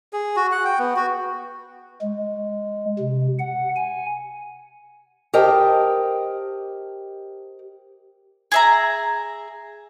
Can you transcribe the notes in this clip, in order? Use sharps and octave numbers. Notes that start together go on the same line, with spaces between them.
G#4
F#4
F#5
G5
B3
F#4
G#3
C3
F#5
G#5
G4 A#4 C5 D#5 G5 A5
G#4 E5 A#5